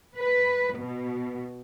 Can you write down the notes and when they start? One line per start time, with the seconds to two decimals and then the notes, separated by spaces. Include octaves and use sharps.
0.20 B4
0.76 B2